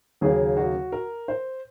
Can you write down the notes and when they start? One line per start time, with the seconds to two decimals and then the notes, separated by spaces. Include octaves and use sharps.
0.21 D#2 C#3 F#3 A#3 G#4
0.57 F#4
0.92 A#4
1.28 C5